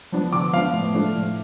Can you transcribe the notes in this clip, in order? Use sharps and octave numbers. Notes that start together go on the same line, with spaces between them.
F3 B3 D4
D3 D6
F3 B3 D4 F5
A2
F3 A3 D4
A2